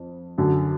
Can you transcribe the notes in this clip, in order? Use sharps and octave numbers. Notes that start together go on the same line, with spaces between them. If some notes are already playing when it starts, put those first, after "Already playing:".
Already playing: F2
F#2 D3